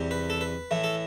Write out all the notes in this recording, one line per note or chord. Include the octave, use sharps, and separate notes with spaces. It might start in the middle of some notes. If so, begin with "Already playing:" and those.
Already playing: E2 C3 G3
B4
A4
B4
A2 E3 A3
A4